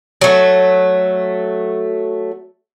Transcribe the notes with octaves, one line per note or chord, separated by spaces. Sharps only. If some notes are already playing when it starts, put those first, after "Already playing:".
F#3 A3